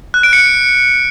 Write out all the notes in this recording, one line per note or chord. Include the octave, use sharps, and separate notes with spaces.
F#6
D7
C#7